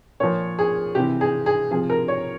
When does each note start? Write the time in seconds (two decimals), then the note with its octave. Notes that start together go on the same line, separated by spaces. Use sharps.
0.20 A#2 F3 C#5
0.59 G#4
0.95 C3 E3 G4
1.21 G#4
1.46 G#4
1.71 C3 F3 G#4
1.90 A#4
2.08 C#5